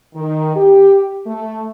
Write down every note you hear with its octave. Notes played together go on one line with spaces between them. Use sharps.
D#3
G4
A3